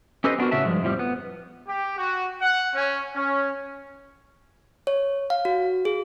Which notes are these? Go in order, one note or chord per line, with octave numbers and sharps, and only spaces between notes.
C#4 G4 A4 B4 C5 D#5
B3 D4 F4 F#4 A#4
A2 C#3 F#4 E5 A5
G2 F3 G#3
F2 A2 F3 G3
B3
G4
F#4
F#5
C#4
C#4
C#5
F5
F#4
G#4